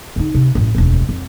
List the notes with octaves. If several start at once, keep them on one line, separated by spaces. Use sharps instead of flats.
D3 D#4
C3
A1 F#2
E1 D2
F2